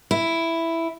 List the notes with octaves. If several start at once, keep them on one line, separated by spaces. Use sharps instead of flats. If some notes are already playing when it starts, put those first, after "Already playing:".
E4